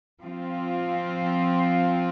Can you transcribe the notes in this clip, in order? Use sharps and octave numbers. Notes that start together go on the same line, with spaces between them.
F3 C4 F4